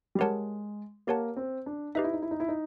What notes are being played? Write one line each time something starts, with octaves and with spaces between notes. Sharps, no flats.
G3
G#3 G4 A#4 C#5 F#5 A5
A#3 G4 A#4 C#5 F#5 A5
C4
D4
D#4 G4 B4 E5
E4
D#4
E4
D#4
E4
D#4